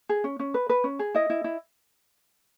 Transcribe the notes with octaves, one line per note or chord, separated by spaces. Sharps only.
G#4
C#4
C#4
B4
B4
C#4
G#4
E4 D#5
E4
E4